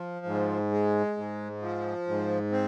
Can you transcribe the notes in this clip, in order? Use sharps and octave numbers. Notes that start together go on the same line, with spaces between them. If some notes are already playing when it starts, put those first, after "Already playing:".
Already playing: F3
G#2
G#3
G#2
F3
G#2
C4